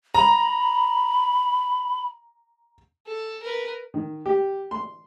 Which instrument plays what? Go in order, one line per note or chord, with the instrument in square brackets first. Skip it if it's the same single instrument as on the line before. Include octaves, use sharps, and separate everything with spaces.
[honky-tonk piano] A#5 [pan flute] B5
[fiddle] A4
A#4 B4
[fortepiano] D#3
G4
C6